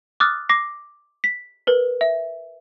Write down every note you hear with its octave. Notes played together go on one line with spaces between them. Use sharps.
D6 D#6 F6 F#6 A6
D6 A#6 C7
B6
A#4 B4
E5